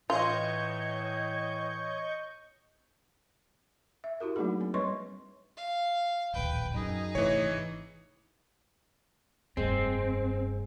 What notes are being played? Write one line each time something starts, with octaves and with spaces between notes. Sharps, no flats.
A2 E3 F4 C#5 D#5 C#6 G6
E5
E4 F#4 G4 A#4
F#3 A3 A#3 D4 D#4 G#4
C4
G3 B4 C#5 D#5 C6 C#6
F5
D1 A#1 D#2 B4 G5
F#2 D#4 G#4
G#1 C3 E3 A3 C#5
F1 G2 G#3 C4